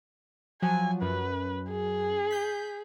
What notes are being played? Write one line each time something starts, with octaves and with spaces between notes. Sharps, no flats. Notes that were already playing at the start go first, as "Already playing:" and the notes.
F3 F#3 G#5
F#2 B4
G#4
G6 B6